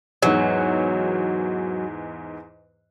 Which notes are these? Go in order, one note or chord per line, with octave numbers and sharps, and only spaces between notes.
E2 G#2 F#3